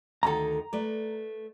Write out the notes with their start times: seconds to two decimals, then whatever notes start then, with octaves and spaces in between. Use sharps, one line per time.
0.23 D2 D#3 A4 A#5
0.73 A3 B4 D5